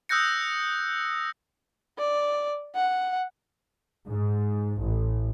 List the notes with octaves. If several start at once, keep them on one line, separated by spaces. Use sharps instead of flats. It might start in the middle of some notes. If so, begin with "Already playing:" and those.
D#6 E6 F#6 G6 A#6 C#7
D5
F#5
G#2
A1